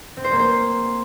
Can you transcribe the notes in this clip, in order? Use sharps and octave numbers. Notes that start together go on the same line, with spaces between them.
C4
C5
A#3
C5